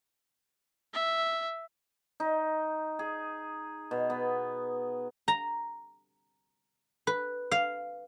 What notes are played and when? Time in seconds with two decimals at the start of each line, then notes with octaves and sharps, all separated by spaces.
0.94 E5
2.20 D#4
2.99 G#4
3.91 B2
4.10 B3
5.28 A#5
7.07 B4
7.52 F5